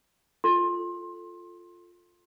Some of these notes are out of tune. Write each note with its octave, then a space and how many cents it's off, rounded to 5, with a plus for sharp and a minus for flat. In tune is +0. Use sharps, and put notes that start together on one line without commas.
F4 +0 A4 +0 C6 +20